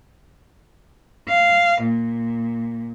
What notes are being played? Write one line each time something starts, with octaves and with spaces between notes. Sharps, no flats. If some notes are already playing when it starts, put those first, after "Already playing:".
F5
A#2